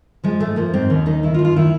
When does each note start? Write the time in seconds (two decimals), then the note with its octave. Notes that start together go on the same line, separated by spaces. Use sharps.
0.24 F3 G#3
0.40 G#2 A3
0.56 F3 A#3
0.73 G#2 C4
0.90 D#2 C#4
1.06 D#3 D#4
1.23 D#3 E4
1.34 F4
1.39 D#2
1.45 F4
1.56 D#3 E4